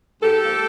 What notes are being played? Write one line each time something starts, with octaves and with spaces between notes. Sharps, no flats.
G#2 G4 A4
F3 A#3